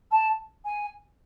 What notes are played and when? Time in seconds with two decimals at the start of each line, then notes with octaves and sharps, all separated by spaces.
0.11 A5
0.65 G#5